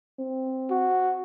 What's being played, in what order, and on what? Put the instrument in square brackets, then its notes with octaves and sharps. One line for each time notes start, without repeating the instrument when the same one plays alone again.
[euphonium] C4
[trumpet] F#4